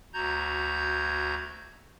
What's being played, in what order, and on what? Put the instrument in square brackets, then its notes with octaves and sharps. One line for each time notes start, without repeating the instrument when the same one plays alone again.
[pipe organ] D2 F#4 A#5 G6 G#6